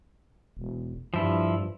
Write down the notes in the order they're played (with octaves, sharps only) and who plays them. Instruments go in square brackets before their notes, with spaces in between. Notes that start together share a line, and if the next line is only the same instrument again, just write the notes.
[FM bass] E1
[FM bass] G2 [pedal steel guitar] F3 E4